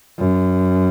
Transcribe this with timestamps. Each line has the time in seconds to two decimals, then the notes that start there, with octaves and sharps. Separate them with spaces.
0.18 F#2